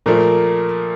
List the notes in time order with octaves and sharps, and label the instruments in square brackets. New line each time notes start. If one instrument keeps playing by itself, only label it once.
[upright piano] A#2 F3 A3 [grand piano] A#4